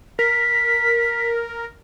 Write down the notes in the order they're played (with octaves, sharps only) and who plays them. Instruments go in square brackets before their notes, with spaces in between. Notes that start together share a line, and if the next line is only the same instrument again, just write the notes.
[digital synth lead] A#4 [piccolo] B6